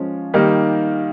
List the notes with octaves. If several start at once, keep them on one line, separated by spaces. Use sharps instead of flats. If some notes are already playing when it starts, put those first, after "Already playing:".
Already playing: F3 G#3 C#4
D#3 G3 A#3 D#4